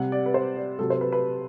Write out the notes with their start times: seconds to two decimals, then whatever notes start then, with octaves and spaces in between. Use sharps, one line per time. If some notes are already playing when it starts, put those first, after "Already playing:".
Already playing: C3 G3 F#5
0.12 D5
0.26 B4
0.34 C5
0.57 D5
0.79 C3 F#3 A4
0.90 C5
1.01 B4
1.12 B4